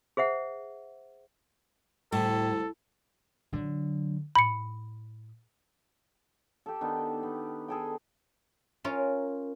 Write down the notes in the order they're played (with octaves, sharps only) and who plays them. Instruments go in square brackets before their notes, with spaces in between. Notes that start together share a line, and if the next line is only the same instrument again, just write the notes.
[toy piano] G#4 C5 E5 F#5
[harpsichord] D2 C3 G3 [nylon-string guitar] A2 [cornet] A4
[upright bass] D3 F#3
[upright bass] A2 [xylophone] B5 C#7
[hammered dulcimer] G4 A4
D#3 B3 D4
B3
G#4 A4 G5
[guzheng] C#4 F4 A#4